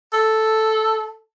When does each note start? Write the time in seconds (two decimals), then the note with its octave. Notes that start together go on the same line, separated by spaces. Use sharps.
0.13 A4